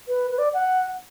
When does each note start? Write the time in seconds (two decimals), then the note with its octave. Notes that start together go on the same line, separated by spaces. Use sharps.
0.08 B4
0.31 B4
0.38 D5
0.54 F#5